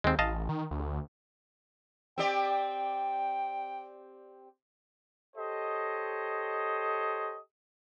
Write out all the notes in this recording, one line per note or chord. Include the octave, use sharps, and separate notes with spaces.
D#2 G#3 C4
A1 D#5 F5 A5
D#3
D2
C4 G4 D5 G5
G4 A4 C5 C#5 D#5